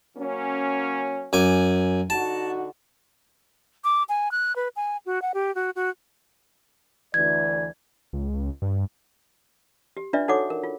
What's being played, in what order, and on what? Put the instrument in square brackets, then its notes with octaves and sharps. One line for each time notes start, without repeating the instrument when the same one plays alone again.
[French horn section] F#3 A#3 C#4
[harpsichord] F#2 G#5 D6
[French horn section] D3 D#4 F#4 [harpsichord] A5
[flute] D6
G#5
F#6
B4
G#5
F#4
F#5
G4
F#4
F#4
[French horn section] D2 E3 D5 [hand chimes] G#6
[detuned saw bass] C#2
G2
[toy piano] G4
D4 F4 B4 D5 E5
D#4 F#4 A4 C#5 F#5 D6
A#4
F4